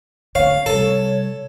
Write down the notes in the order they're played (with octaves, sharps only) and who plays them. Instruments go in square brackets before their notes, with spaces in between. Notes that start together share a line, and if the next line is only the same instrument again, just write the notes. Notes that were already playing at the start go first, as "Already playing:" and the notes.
[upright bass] D3 C4 [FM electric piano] C#5 [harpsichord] F5
[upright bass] C3 G3 [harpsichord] A4